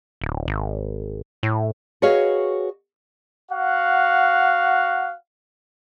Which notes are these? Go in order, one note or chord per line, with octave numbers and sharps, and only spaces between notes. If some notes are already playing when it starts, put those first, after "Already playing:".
D1
G#1
A2
F#4 G#4 B4 C#5 D#5 F5
F#4 F5 F#5